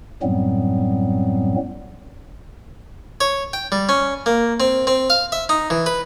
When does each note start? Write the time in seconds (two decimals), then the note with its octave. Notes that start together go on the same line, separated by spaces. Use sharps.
0.22 F#2 A2 F#3 G3 B3 C4
3.21 C#5
3.53 G5
3.72 G3
3.89 C#4
4.26 A#3
4.60 C4
4.87 C4
5.10 F5
5.32 E5
5.49 D#4
5.70 E3
5.86 B4